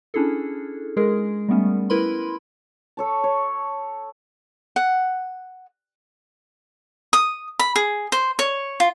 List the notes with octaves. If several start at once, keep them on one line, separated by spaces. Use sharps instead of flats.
C#4 D4 E4 G#4 A4
G#3 G#4 A#4
G3 A3 B3 C#4
E4 A#4 B4 B5 C6
A4 C#5 A5
C#5
F#5
D#6
B5
G#4
C5
C#5
F4